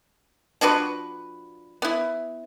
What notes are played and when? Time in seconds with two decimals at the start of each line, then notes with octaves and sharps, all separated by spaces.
0.61 F3 D4 F#4 B4
1.82 B3 E4